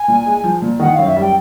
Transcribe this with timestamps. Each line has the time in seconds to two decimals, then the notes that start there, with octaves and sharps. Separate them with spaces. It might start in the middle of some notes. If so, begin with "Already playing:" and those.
Already playing: G#5
0.08 A#2
0.26 G#3
0.44 F3
0.62 A#2
0.79 D#3 F#5
0.94 F5
0.99 F#2
1.07 E5
1.17 G3 G5